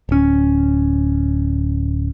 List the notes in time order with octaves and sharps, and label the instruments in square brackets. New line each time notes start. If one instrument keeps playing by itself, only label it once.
[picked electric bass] D1 C#4